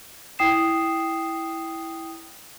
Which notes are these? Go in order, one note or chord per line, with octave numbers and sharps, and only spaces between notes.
E4 G5 D#6 C7 E7